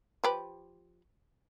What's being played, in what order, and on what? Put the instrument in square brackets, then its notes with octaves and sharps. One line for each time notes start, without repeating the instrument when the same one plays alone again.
[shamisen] F3 G4 B4